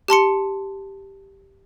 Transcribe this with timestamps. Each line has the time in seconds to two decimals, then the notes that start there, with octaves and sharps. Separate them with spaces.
0.08 G4 A5 C6 C#7